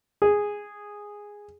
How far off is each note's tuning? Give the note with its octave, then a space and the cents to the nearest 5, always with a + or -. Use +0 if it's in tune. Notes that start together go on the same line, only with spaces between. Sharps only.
G#4 -5